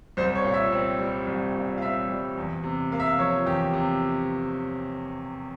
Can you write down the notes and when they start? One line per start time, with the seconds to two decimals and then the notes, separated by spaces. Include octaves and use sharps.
0.17 C2 C5
0.35 C#5
0.44 A#2
0.54 E5
0.72 C4
0.99 G3
1.27 C2
1.54 A#2
1.78 F5
1.82 C4 E5
2.09 G3
2.37 E2
2.64 C3
2.92 A#3 F5
3.00 E5
3.06 F5
3.19 F3 C#5
3.46 E2 G4
3.73 C3